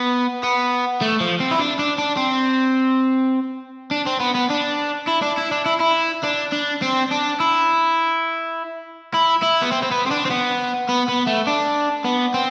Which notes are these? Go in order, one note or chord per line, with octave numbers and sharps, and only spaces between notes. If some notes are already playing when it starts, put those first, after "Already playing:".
Already playing: B3
B3
A3
F3
C4
E4
D4
D4
D4
C4
D4
C4
B3
B3
D4
E4
D4
E4
D4
E4
E4
D4
D4
C4
D4
E4
E4
E4
B3
C4
C4
B3
C4
D4
C4
B3
B3
B3
A3
D4
B3
C4